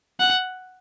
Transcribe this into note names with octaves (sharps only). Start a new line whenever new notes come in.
F#5